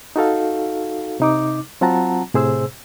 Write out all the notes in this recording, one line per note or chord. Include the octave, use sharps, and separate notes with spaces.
D#4 F#4 A4 F5
C3 D#4 D6
F#3 C4 F4 F#5 A5 A#5
A2 C3 G#4 C5 E6